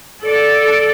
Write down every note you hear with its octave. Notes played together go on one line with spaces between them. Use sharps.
A4 D5